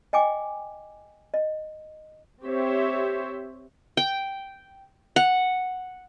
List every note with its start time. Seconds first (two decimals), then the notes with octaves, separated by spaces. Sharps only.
0.13 D#5 G5 G#5 D6
1.34 D#5
2.43 C4 G4 C5 C#5 E5
3.97 G5
5.16 F#5